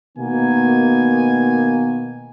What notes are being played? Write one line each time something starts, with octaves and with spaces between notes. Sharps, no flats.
B2 D#3 A#3 B3 G#5